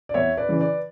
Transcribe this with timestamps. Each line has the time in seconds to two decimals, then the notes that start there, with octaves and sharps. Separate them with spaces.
0.09 D5
0.14 E2 C#5 E5
0.37 B4 D5
0.49 C#3 E3
0.60 B4 D5